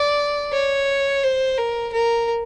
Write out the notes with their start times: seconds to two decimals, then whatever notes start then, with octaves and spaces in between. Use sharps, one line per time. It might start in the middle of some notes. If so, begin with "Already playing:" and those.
Already playing: D5
0.53 C#5
1.23 C5
1.57 A#4
1.93 A#4